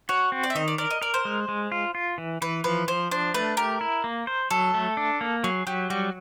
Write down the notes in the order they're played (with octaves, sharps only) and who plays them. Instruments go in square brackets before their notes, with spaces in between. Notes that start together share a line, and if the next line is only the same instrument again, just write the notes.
[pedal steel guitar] F#4 [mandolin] C#5
[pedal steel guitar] C4
[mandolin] D5
E5
[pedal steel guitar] D#3 [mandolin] D#5
[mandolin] D5
[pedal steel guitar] A#4 [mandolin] D5
[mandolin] D#5
[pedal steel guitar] A#4 [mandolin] D5
[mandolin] C5
[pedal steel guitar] G#3
G#3
F4
F4
E3
[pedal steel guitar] E3 [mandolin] B4
[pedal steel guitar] F3 [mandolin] B4
[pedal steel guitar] F3 [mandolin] C5
[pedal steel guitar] D4 [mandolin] C5
[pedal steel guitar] A3 [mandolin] B4
[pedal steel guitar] G4 [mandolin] A#4
[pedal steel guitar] E4
A#3
C5
[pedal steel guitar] F#3 [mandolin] A4
[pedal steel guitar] A3
D4
A#3
[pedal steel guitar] F#3 [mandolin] G#4
[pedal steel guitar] F#3 [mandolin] G4
[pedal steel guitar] G3 [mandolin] F#4